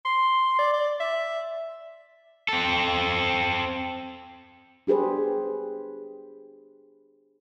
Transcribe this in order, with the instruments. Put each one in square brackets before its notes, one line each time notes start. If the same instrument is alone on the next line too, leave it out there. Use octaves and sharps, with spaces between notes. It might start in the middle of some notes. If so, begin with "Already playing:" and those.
[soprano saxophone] C6
D5
D5
E5
[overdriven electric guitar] C4 A4
[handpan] D4 G4 G#4 B4 C5